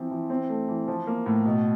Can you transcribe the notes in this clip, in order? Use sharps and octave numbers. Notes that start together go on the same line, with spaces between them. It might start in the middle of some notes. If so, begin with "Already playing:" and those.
Already playing: E3 F3 C4
E3
C4
A3
E3
F3
A#3
A2
B2